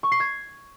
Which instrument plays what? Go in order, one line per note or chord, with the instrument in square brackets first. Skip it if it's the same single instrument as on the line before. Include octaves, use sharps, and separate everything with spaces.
[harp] C#6
C7
G#6